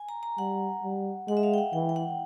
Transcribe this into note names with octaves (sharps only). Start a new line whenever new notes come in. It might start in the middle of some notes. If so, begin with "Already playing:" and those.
Already playing: G#5
A#5
A#5
G3 F#5
G3
G#3 F#5
E5
F5
G5
F#5
E3 G5
G5
F#5